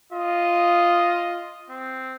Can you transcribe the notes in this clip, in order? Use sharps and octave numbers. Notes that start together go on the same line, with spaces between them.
F4 D#5
C4